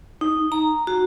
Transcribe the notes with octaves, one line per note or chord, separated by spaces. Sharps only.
D#4
A#5
F#4